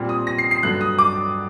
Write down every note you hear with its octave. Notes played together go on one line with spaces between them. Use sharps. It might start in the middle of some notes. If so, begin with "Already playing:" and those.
Already playing: A#2 G3 C4
D#6
A#6
C7
C7
G2 D3 F#3 F#6
D#6
D6